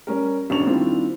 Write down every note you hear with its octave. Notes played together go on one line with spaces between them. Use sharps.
G3 C#4 A#4
E1 C#4 D4 C#6 F7
D#3 G3 C4 D4 E4 F4